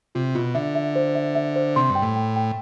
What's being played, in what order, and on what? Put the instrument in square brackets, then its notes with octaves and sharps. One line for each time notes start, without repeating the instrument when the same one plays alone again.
[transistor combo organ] C3 [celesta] F4
[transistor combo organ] B2 [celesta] F4
[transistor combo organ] D3 [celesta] E5
[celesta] E5
C5
E5
E5
C5
[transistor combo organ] C3 [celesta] C6
[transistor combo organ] G2
[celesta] G5
[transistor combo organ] A2
[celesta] G5
G5